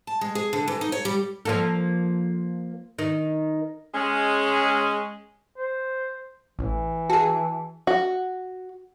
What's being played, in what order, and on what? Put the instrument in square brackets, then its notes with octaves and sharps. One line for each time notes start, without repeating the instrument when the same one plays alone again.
[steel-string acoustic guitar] A5
G#3
G#4
D3
E3
D#4
C#5
G3
[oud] F3 A#3 A4
D#3
[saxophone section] G#3 C#4
[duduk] C5
[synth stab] A1 [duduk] E3
[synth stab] F#4 G#4 [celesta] A5
[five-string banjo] F#4